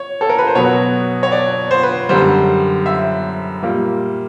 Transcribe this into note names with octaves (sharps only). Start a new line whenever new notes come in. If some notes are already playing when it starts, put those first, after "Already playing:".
Already playing: C#5
A4
A#4
B4
C5
B2 F#3 B3 C#5
C#5
D5
C5
B4
F#2 D3 G3 C5
E5
A#2 G3 A#3